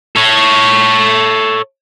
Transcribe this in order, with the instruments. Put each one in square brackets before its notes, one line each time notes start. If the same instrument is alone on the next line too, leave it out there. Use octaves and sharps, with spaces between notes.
[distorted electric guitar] A4 C#5